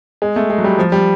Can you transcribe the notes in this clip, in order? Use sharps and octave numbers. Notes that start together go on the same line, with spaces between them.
G#3
A3
G#3
F#3
G3
F3
G3